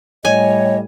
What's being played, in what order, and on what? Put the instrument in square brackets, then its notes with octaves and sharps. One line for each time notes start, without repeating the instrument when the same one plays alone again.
[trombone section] A2 G3 [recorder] C#5 [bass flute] D#5 [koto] G#5